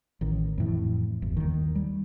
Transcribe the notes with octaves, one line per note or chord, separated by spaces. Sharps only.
A1 D#3
F2 A2 E3
G1 E2
D#2 D#3
G3